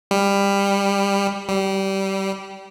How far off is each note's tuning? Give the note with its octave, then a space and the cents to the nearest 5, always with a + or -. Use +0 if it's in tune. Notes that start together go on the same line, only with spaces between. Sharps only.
G3 +20
G3 -20